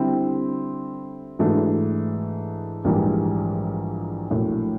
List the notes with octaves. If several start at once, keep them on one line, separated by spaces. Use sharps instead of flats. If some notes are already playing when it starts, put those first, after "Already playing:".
Already playing: D3 G3 C4 E4
G#2 E3 A3 D4 F#4
A#1 G#2 E3 G3 A#3
A#1 A2 F#3 A#3